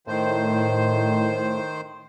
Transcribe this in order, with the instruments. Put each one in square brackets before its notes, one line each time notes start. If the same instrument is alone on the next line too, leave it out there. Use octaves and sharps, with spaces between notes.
[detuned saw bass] A2 [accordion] D#3 C5